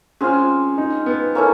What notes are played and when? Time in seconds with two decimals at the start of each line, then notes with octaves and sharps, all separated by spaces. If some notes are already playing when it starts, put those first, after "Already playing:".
0.21 G#3 C4 C#4 F4
0.78 D#4
1.06 B3
1.35 A#3 C#4 E4 A4